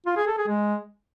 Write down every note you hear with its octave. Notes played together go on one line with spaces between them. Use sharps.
F4
G#4
A4
G#4
G#3